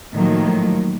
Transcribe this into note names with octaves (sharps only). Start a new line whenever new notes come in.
A2 D#3 F3 F#3 A#3